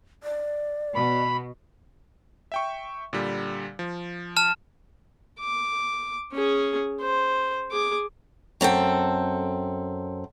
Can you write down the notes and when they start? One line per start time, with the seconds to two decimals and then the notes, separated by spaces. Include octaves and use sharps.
0.23 D5
0.96 B2 B5
2.52 E5 G5 C#6
3.13 A#2 D3 G3
3.79 F3
4.36 A5 F6 E7
5.40 D6
6.32 C#4 G#4
7.01 C5
7.72 G#4 D6
8.61 F#2 C4 A4 G5